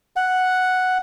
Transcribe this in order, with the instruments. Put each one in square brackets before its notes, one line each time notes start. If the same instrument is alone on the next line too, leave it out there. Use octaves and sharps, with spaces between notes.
[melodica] F#5